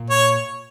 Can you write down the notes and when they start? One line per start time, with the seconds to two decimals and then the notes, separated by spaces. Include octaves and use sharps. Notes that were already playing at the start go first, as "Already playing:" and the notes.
Already playing: A#2
0.10 C#5